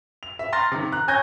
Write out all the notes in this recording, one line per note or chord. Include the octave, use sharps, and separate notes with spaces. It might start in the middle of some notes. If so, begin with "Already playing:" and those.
F7
E5
A#5 C6 F6 A6 A#6
C3 D#3
A#5 F#6
C#5 G#5 G6 G#6 A#6